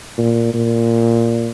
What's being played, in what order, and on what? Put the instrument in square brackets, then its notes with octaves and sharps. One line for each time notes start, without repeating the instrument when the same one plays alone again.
[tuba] A#2
A#2